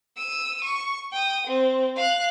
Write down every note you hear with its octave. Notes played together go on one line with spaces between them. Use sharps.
E6 D#7
C#6
G5 D#6
C4
F5 F#6